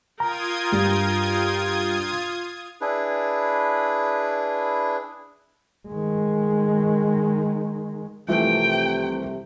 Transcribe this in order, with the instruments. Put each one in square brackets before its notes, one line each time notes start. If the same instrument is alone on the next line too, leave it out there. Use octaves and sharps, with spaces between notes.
[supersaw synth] F4 D#6 G#6 [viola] A#4 G5 [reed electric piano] A#5
[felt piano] G2
[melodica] D4 E4 G#4 B4
[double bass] D#3 G#3
[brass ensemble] C2 C3 [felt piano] E3 F3 A3 [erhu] G5